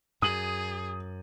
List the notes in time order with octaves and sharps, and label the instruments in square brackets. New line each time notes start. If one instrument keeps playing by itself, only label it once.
[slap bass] F#2 [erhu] G#4 [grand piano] D#6 D#7 F#7